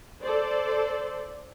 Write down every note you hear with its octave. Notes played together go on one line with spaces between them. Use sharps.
A4 C5 D5